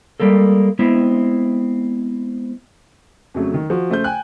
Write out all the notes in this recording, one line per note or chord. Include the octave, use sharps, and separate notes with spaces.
G3 G#3 A#3 A4
G#3 B3 C4 E4
F2 C#3 F#3 A3
D#3
F3 F#4
C#3 A3 C5 G6
G5 G#5 F#6